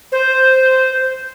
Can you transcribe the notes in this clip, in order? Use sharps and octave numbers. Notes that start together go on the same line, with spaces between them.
C5